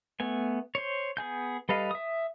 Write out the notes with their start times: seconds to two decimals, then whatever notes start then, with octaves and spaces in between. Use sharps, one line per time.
0.20 A3 B3 G#5
0.75 C5 C#5
1.17 B3 G#4 G#5 G6
1.69 G3 A4 B4 D#5 F5
1.91 E5 D#6